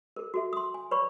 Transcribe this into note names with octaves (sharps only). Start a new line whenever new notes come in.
A4 A#4
F#4 A4 E5
C6 D#6
G#5
B4 C#5 D5 B5 C#6